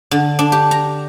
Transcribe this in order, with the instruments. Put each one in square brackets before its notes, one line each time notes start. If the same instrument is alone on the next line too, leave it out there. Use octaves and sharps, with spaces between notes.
[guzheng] D3
D4
G4
A#5